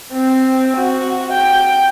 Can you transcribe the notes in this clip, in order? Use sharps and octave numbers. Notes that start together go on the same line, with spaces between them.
C4
F#4
G5